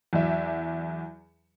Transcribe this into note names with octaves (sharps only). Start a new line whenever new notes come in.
E2 F#3 D5 E5